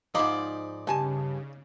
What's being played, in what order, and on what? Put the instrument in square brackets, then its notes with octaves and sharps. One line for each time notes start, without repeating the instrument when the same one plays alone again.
[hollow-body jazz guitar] G#2 F3 [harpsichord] D#4 B5 [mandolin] D5
[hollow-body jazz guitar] G2 G#5 A5 [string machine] C#3